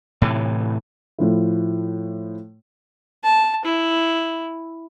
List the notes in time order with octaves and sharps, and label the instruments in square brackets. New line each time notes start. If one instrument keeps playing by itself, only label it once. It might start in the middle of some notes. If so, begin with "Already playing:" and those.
[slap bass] A2 C3 E3
[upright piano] A2 F3 E4
[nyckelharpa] A5
E4